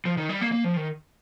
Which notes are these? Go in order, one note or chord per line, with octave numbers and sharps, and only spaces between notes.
F3
D#3
G3
A#3
A#3
F3
D#3